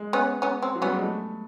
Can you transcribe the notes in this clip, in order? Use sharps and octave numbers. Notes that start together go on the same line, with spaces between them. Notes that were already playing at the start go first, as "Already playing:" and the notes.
Already playing: G#3
B3 C#4
B3 C#4
C4
F#3
G3 B3 C#4
G#3
A3